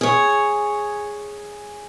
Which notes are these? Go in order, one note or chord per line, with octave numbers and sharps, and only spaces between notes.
G#4 C#5